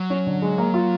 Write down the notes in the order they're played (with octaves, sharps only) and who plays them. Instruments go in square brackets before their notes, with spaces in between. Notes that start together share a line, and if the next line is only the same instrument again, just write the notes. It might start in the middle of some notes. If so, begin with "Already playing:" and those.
Already playing: [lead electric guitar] F#3
[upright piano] C#4
D3
G#3
A#3
F4